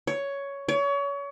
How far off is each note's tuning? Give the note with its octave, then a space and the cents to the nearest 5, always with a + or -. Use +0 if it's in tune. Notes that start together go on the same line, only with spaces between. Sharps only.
C#5 +10
C#5 +30